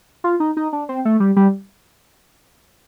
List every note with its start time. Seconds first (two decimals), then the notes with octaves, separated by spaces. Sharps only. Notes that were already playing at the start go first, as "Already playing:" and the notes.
0.24 F4
0.40 D#4
0.57 D#4
0.73 D4
0.89 C4
1.05 A3
1.20 G3
1.36 G3